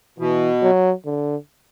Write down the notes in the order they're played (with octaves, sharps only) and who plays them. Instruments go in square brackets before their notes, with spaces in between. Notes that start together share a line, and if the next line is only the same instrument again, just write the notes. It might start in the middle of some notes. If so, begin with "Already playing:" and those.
[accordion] B2 [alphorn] E3
[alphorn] F#3
D3